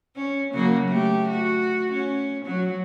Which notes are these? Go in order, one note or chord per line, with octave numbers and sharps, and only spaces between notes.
C#4
C#3 F#3 A#3
A3 G4
F#4
C#4
F#3